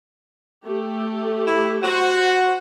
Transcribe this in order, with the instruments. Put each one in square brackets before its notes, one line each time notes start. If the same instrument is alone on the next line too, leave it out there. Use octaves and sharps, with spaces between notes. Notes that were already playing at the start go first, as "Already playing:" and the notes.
[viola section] A3 G4
[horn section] E4
[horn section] F#4 [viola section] C5 F#5